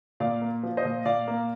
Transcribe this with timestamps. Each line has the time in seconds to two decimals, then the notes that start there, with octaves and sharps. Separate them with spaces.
0.20 A#2 D5 F5
0.42 A#3
0.63 F3
0.77 C5 D#5
0.85 A#2
1.05 A#2 D5 F5
1.28 A#3